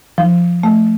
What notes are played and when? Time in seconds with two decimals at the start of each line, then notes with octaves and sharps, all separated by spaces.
0.18 F3
0.63 A3